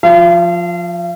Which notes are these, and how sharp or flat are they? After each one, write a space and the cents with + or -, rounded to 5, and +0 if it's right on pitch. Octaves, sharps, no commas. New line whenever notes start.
F3 +10 F5 -40